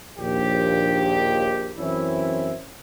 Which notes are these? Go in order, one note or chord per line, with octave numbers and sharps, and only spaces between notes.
A#1 D#2 G4
F#2 E3 C4 C#4 E4